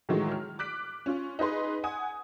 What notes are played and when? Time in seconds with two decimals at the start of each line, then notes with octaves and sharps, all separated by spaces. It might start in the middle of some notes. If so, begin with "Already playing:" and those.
0.09 A2 D#3 E3 F#3 G#3
0.32 F6
0.59 D6 F#6 B6 D7
1.06 C#4 F4
1.39 D#4 G#4 B4 C6
1.84 F#5 G#5 D#6